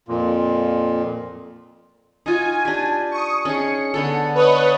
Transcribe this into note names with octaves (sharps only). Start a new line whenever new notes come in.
F2 A#2
D#4 F4 F#4 G#5
D4 G4
C#6 D#6
C#4 D#4 G#4 C#7
D3 B3 A4
B4 C#5 D#5